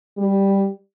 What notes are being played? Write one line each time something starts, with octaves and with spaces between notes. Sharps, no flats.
G3